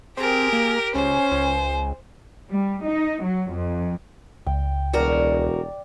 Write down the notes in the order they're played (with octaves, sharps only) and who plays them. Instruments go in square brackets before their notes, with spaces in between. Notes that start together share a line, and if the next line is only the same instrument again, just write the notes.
[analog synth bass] C4 [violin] G4 A#4 [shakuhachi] G#4
[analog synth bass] A#3
[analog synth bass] C#2 [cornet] C#4 [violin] C5 [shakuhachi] G#5
[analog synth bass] C#2
[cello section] G3
D#4
F#3
F2
[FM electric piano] C#2 [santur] G5
[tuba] E1 [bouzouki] F#4 A#4 [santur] D5